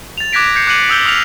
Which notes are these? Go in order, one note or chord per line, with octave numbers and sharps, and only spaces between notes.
A6 F7
D6 F#6 G#6 A#6 B6 D7
G6 G#6 C7 C#7
D6 F#6 C7 C#7 D#7 F#7
D#6 E6 G6 G7
D6 D#6 F6 B6 F7 G7